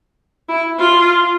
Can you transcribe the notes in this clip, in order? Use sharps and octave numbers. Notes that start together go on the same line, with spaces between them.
E4
F4